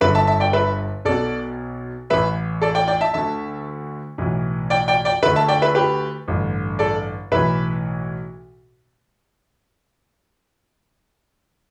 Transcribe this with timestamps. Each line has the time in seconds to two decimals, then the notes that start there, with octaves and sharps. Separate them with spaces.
0.01 G1 G2 D3 B4 E5
0.15 E5 A5
0.27 E5 A5
0.40 D5 G5
0.53 B4 E5
1.05 B1 B2 A4 D5
2.10 A1 A2 E3 B4 E5
2.62 A4 D5
2.75 D5 G5
2.88 D5 G5
3.01 E5 A5
3.14 D2 D3 E5 A5
4.18 B1 A2 E3
4.70 D5 G5
4.88 D5 G5
5.05 D5 G5
5.23 D3 B4 E5
5.26 D2
5.36 E5 A5
5.48 D5 G5
5.62 B4 E5
5.75 G4 B4
6.28 A1 G2 D3
6.79 A4 D5
7.32 B1 A2 E3 B4 E5